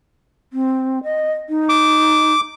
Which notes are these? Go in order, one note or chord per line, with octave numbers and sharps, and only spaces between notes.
C4
D#5
D#4
D6